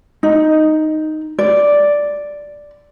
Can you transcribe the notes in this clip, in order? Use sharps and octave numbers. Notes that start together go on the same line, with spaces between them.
D#4
D5